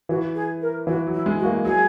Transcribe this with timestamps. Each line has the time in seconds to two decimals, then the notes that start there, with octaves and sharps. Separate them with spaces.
0.09 E3 F#4
0.35 G#4
0.61 A#4
0.87 E3 F#4
1.07 F#3
1.13 E4
1.26 G#3
1.39 F#4
1.45 A#3
1.64 F#3 G#4